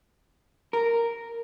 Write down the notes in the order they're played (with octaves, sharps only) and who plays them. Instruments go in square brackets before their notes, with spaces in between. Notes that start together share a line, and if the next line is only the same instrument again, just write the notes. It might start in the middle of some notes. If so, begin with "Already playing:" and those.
[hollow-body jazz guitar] A#4